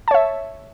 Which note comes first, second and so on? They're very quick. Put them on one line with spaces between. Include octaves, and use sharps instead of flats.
A5 C#5 E5